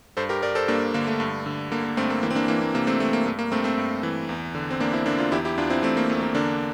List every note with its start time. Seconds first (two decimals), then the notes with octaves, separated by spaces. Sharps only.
0.17 G2 A4 C5
0.29 G4 A#4
0.42 G2 A#4 D5
0.55 A4 C5
0.68 G2 A#3 D4
0.94 D3 A#3
1.07 A3
1.20 G2
1.46 D3
1.71 D3 A#3
1.84 A#3
1.97 G2 A3 C4
2.10 A#3
2.23 E3 A#3
2.31 C4
2.35 A#3 D4
2.48 E3 A#3
2.62 A#3
2.74 C3 A#3
2.87 A3 C4
3.00 E3 A3
3.13 A#3
3.26 G2 A3
3.39 A#3
3.52 G2 A3 C4
3.64 A3 C4
3.78 G2
4.03 E3
4.29 E2
4.55 D3
4.70 C4
4.80 E2 A#3 D4
4.93 C4 E4
5.06 D3 A#3 D4
5.19 D4 F4
5.32 E2 E4 G4
5.45 E4 G4
5.57 E2 D4 F4
5.70 C4 E4
5.83 E2 A3 C4
5.97 A#3
6.10 E2 A3
6.23 A#3
6.35 D3 A#3 D4